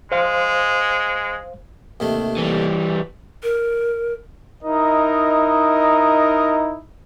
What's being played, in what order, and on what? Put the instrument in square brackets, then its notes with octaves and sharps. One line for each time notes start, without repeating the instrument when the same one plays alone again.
[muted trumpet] G#3 [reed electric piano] C5 F5
[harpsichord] D#2 C3 A3
[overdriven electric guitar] E3 G3
[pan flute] A#4
[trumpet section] D#4 E4 A#4 D#5